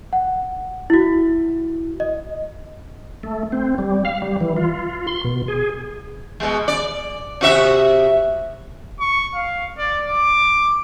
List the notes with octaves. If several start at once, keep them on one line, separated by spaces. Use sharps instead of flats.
F#5
E4 F#4
D#5
A3
C4
G3
F5
G3
E3
F4
C6
B2
G#4
B2 G#3
D5
C3 F#4 E5
C#6
F5
D5
D6